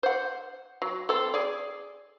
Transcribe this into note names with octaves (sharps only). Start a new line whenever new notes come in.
C5 F#5
F#3
C4 A4
G#4 D5